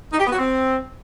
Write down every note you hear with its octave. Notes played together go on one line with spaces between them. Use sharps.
D#4
G4
B3
F#4
C4